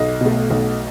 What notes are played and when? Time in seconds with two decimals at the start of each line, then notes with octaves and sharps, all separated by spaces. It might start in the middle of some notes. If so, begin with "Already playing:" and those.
Already playing: B1 D#5
0.21 B2 A3
0.50 B1